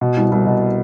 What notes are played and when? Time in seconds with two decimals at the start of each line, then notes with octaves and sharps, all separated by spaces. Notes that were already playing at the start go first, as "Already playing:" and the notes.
0.01 B2
0.17 C2
0.32 C2
0.46 B2